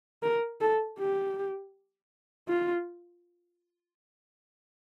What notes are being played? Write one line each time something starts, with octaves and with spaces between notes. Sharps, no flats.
A#4
A4
G4
F4